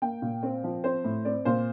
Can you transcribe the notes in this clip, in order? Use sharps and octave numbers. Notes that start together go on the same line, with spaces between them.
A#3 G5
A#2
C4
F3
C4 C5
A2
C4 D5
A#2 C5